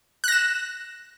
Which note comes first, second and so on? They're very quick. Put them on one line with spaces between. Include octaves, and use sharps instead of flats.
F#6 A#6 E7